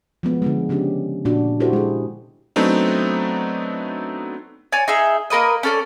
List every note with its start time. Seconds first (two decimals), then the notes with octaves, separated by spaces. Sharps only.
0.23 F3 G#3 B3
0.42 D3 F3 G#3
0.69 C#3 C#4 D4 G4
1.25 A#2 D4 F#4
1.60 E4 F#4 G4 A4 C5
1.73 G#3 G#4
2.56 F#3 A3 B3 C4 D4 D#4
4.72 C#5 D5 G#5
4.88 D#4 G#4 E5
5.30 A#3 A#4 B4 D#5
5.63 C#4 A4 D5